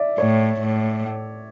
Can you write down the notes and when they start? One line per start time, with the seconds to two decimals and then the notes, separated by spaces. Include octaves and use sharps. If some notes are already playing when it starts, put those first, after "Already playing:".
Already playing: D5 E5
0.18 A2 C#5
0.61 A2